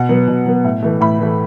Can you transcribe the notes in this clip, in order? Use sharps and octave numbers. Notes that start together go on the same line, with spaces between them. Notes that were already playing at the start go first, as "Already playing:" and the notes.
Already playing: B2 F#5
F#3 B3
B2
F#3 B3
A2
E3 A3
A2 B5
E3 A3